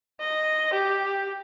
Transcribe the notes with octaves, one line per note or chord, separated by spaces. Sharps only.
D#5
G4